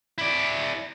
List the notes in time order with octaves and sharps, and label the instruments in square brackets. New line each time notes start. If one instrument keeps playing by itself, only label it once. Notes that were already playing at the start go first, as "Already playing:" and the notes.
[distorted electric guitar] E4 D5